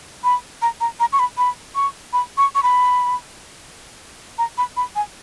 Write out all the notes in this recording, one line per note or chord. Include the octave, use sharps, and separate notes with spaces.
B5
A#5
A#5
A#5
C#6
B5
B5
C#6
B5
C#6
C#6
B5
A#5
B5
B5
G#5